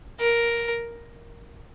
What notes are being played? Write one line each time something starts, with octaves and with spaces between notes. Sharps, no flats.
A#4